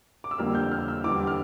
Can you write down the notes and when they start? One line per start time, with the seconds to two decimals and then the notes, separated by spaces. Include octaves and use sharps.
0.24 D6
0.31 E6
0.38 F2 D3 G3 A#3 F6
0.55 G6
0.72 F6
0.88 E6
1.04 E2 D3 G3 D6
1.27 F6